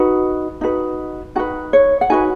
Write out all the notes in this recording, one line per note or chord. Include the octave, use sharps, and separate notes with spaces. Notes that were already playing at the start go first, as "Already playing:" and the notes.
Already playing: D#4 F#4 B4
D#4 F#4 B4
D#4 F#4 B4 F#5
C#5
F#5
D#4 F#4 B4 G#5